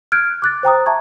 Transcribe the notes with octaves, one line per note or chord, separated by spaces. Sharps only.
F6 F#6 G#6 D7
D6 F#6 A6
C5 G5 A#5 D#6
E5 A5 A#5 C#6 G#6